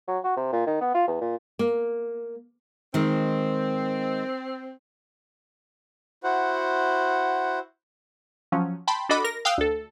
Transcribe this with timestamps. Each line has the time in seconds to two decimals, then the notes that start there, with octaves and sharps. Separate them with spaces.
0.08 F#3
0.24 F#4
0.37 C3
0.53 A#2
0.67 D#3
0.81 B3
0.94 F4
1.08 E2
1.21 A#2
1.59 A#3
2.94 D#3 G#3 C4
6.24 E4 F#4 C5 F#5
8.52 F3 F#3 C#4
8.88 G5 A5 B5 C6
9.09 D4 F#4 A4 D#5 B5 D6
9.24 A#4 A#6
9.45 F5 G5 D#6 E6 F#6
9.58 D2 A4